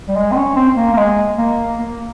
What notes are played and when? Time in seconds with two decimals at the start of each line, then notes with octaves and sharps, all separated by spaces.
0.08 G3
0.16 G#3
0.32 C4
0.36 C#4
0.55 C4
0.76 A#3
0.93 A#3
0.97 G#3
1.38 A#3
1.78 A#3